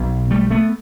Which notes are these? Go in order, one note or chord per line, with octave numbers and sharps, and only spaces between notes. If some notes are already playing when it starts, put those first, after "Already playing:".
Already playing: B1 B2
G3 A3
A3 B3